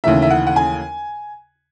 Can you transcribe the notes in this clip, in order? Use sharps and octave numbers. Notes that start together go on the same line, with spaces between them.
D#2 C#3 E3 A3 E5
E5
F#5
F#5
G#5